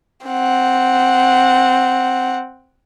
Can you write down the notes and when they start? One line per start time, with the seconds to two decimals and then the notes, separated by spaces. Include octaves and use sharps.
0.26 C4 F#5